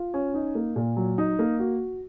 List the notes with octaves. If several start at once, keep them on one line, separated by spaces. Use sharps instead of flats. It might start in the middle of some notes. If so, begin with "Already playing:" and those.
Already playing: F4
C#4
D#4
A#3
A#2
F#3
D#4
A#3
F#4